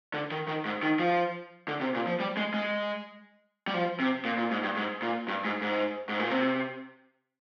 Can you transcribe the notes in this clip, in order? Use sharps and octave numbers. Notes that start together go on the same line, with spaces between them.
D3
D#3
D#3
G#2
D#3
F3
D3
C3
A#2
F3
G3
G#3
G#3
G3
F3
C3
A#2
A#2
G#2
G2
G#2
A#2
G2
G#2
G#2
G#2
A#2
C3